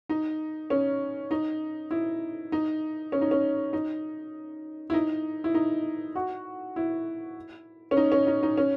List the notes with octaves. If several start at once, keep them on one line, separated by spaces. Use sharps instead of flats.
D#4
C#4
D#4
E4
D#4
C#4
D#4
C#4
D#4
E4
D#4
E4
D#4
F#4
E4
C#4
D#4
C#4
D#4
D#4
C#4